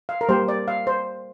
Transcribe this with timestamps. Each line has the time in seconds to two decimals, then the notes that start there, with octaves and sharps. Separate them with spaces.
0.09 F5
0.21 A#4
0.29 G3 A#3 G4 C5
0.48 D5
0.68 F5
0.87 C5